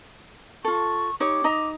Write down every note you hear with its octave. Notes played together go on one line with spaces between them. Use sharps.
F4 A4 C#6
D#4 G4 C#5 D6
D#4 D#5 A#5